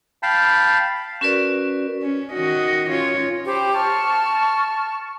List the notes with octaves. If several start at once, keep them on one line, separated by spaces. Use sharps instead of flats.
F5 G5 A5 B5
C#4 F#4 A#4 B4 D5
C#4
D#3 F#4 D#5
C#4 F4 C#5
G4 C5 G5 B5
A5 C#6 F6